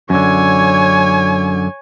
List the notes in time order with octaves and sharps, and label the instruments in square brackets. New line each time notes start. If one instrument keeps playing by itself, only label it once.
[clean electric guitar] F#2 D3 [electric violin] C#5 G#5